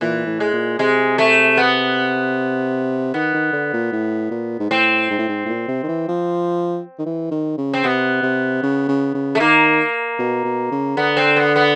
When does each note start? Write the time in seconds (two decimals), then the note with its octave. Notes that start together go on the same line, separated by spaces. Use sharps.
0.01 A#2 E3
0.27 A2
0.40 G#3
0.53 A#2
0.79 C3 G#3
1.18 A3
1.57 B3
3.14 D#3 B3
3.34 D#3
3.53 D3
3.73 A#2
3.92 A2
4.31 A#2
4.60 G#2
4.70 A2 C4
5.10 G#2
5.19 A2
5.29 G#2
5.45 A2
5.49 A#2
5.68 C3
5.83 D#3
5.88 E3
6.08 F3
6.99 D#3
7.06 E3
7.31 D#3
7.58 C#3
7.74 C4
7.84 C3 B3
8.22 C3
8.63 C#3
8.88 C#3
9.14 C#3
9.35 A3
9.40 D#3 A#3
10.19 B2
10.44 B2
10.71 C#3
10.97 D3 B3
11.17 C4
11.37 B3
11.56 B3